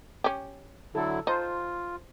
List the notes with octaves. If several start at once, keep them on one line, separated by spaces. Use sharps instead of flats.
C#4 G4
D3 F#3 E4 A4
D#4 F4 C5 A5